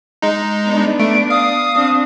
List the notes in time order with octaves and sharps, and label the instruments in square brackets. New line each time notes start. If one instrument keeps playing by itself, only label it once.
[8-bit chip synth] G#3 D#4
[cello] B3 D4
[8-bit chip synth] A3 [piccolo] D7
[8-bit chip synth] F5 [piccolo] D#6
[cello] C4 D4